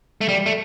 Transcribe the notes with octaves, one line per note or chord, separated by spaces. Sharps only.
A3
G3
A3